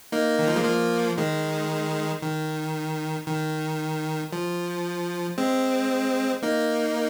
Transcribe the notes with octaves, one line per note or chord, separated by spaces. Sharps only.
A#3 D#4
D#3
F3
G#3
F3 A#3
D#3 G#3
D#3
D#3
F3
G#3 C4
A#3 D#4